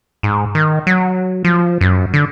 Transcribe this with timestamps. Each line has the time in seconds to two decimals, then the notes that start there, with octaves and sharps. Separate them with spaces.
0.23 G#2
0.55 D#3
0.87 F#3
1.45 F3
1.81 F#2
2.14 D3